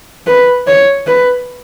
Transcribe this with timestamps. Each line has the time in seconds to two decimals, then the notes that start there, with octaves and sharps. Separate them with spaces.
0.27 B4
0.67 C#5
1.07 B4